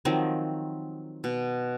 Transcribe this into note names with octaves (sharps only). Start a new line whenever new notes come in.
D#3 F3 F#3 C4
B2